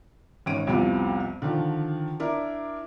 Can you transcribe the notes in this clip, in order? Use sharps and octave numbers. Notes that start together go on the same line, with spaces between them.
G#1 C#4 D7 D#7
C2 F2 C3 F3 G3 B3
D3 D#3 F3
D4 E4 A#4